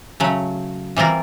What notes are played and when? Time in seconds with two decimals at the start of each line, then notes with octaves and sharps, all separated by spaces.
0.20 C#3 F#3 A3
0.96 E3 G3 C4 F4 A#4